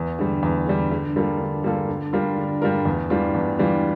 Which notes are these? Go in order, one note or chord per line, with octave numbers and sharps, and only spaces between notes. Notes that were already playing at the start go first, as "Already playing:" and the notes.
Already playing: E2
D3 G3
E2
D3 G3
D3
G3 A#3 F4 A4
D3
G3 A#3 F4 A4
D3
G3 D4 F4 A#4
D3
G3 D4 F4 A#4
E2
E3 G3 D4 F4
E2
E3 G3 D4 F4